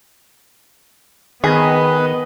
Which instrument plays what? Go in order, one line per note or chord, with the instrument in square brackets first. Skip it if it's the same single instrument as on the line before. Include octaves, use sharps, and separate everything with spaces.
[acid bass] D#3 [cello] B3 [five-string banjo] G#4 [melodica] B4 D#5